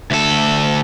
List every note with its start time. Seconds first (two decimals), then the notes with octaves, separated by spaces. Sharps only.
0.11 D2 A4